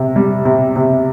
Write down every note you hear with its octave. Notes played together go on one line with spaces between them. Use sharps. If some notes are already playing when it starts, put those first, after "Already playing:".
Already playing: C3
G3
C3
C3